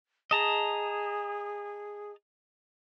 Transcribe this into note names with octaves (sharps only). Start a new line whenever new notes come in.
G#4 D#5 A5 A#5